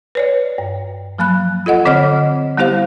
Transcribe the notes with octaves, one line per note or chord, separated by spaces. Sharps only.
B4 C#5 D5
G2
F3 F#3 A#3 B5 F#6
F4 A4 D#5 F#5
D3 C4 C#5 D#5 F#5 F6
G3 B3 E4 G4 C5 F5